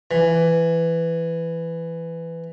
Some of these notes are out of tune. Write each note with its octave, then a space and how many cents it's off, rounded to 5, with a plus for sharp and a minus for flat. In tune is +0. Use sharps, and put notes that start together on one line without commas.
E3 +10